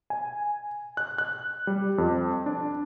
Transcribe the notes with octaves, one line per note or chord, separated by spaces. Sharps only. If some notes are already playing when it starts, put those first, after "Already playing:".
G#5
F#6
F#6
G3
F2
D4